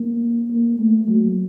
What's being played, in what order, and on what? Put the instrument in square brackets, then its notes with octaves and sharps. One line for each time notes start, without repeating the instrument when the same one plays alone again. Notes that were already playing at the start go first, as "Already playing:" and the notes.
Already playing: [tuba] A#3
A#3
A3
F#3